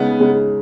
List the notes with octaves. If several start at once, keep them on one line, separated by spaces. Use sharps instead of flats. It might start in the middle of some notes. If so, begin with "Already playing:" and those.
Already playing: C#3 G#3 B3 D#4
C#3 G#3 D#4